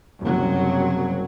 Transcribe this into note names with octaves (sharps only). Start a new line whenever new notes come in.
F#1 C2 F#3